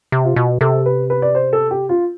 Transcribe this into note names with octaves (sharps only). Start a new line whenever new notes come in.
C3
F4
B2
C3 A4
B4
B4
D5
C5
A4
G4
F4